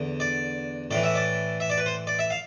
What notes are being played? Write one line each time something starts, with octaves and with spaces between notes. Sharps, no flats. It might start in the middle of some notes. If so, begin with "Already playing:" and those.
Already playing: E2 D3
D5
A2 E3 D5
E5
D5
E5
D5
B4
C5
D5
E5
F5